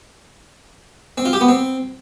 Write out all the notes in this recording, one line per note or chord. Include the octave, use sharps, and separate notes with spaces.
C4
F4
G4
B3
C4